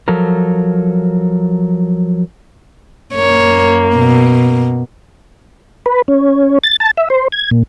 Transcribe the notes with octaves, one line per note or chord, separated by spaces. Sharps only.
F3 F#3 A4 A#4
F#2 A#3 C#5
B2
B4
C#4
A6
A5
E5
C5
G#6
A#2